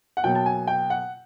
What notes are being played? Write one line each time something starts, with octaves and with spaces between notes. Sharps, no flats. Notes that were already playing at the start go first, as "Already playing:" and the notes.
F#5
B2 F#3 A#3 G5
A5
G#5
G5
F#5